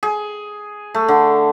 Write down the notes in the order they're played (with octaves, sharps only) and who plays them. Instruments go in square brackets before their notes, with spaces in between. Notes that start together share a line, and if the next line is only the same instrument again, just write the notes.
[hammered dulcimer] G#4
A3
D3